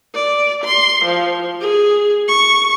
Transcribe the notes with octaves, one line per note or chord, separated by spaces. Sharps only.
D5
C6
F3
G#4
C#6